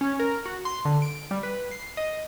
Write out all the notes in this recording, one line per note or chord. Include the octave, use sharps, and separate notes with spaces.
C#4
A#4
F#4
C6
D3
D7
G3
B4
C7
D#5